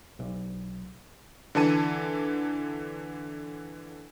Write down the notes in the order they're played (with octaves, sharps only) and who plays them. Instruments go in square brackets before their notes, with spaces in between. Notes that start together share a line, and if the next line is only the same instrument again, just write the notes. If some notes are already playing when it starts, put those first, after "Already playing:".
[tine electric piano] B1
[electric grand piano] D3 E3 A5 D#7